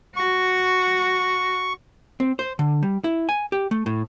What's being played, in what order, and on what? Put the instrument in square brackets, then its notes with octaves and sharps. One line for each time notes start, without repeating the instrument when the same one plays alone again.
[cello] F#4 [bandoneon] C#6
[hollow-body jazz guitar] C4
C5
D3
G3
E4
G#5
G4
A3
A2